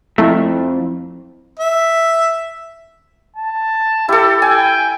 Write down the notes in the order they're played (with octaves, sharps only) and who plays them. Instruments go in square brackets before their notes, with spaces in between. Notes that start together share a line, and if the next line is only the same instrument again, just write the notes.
[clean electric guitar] F2 [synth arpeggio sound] A3 [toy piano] E4 D5
[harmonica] E5
[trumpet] A5
[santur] E4 A4 [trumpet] G4
[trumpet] G5 [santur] G#5